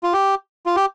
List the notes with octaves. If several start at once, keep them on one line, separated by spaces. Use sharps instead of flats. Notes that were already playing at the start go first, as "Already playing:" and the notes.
F4
G4
F4
G4